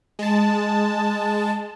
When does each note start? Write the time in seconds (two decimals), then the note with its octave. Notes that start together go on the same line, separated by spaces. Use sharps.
0.19 G#3 A5